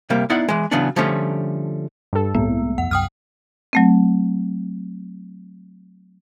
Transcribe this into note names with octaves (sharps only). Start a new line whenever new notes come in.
C3 G3 A#3
B3 D#4 E4 D5 F5 F#5
E3 G#3
C#3 E3 F#3 B3 C#4 D4
D3 F3 G3 A3 C#4
G2 A4
C2 A2 G3 G#3 A#3 B3
F2 F#5
C2 F#2 G5 D#6 F6
F#3 A3 C4